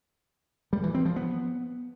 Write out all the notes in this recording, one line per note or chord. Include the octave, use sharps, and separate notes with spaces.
G3
E3
C4
F3
B3